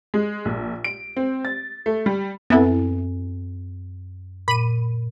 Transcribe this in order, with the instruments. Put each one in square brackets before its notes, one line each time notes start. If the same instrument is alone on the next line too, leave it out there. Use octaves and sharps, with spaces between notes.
[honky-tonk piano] G#3
A#1
D7
C4
A6
A3
G3
[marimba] F#2 G#5 A6 [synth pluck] B3 E4 [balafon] C4 A4
[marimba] A#2 [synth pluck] B5 D#7